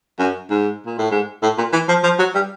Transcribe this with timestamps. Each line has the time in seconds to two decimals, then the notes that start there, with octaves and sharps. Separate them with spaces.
0.19 F#2
0.50 G#2
0.86 A#2
0.98 A2
1.11 G#2
1.42 A2
1.58 A#2
1.73 E3
1.88 F3
2.04 F3
2.19 F#3
2.35 G3